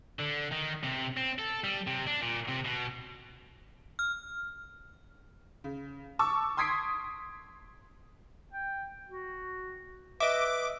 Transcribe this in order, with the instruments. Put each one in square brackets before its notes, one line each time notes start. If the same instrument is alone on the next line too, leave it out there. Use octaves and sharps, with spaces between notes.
[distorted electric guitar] D3
D#3
C3
C4
A4
G3
C3
D4
A#2
C3
B2
[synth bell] F6
[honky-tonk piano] C#3
A5 C#6 D6 E6
C6 D#6 G#6 B6 C7 D7
[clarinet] G5
F#4
[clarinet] B4 [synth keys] D#5 E5 [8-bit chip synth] D6